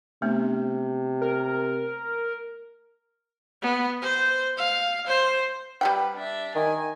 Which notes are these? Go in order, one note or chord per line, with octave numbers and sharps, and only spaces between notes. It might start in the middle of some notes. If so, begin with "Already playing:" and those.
C3 A3 B3 D4
A#4
B3
C5
F5
C5
G3 G4 B4 G5
D4 E5
D#3 G#5